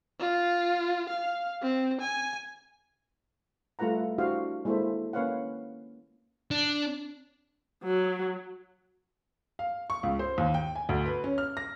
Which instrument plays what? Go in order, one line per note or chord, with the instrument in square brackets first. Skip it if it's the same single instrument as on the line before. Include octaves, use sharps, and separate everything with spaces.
[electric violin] F4
F5
C4
G#5
[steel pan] G3 A3 F4 B4 F#5 A#5
D4 E4 F#4 G4 C5 F5
G#3 A#3 E4 A4 C5 E5
A#3 C#4 B4 C#5 F5 F#5
[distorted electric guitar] D4
[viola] F#3
[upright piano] F5
C#6
C#2
C5
D#2
G5
G#5
D2
B4
C#4
F6
A#6